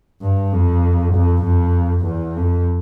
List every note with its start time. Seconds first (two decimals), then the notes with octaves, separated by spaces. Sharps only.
0.22 G2
0.53 F2
1.14 F2
1.45 F2
2.05 E2
2.36 F2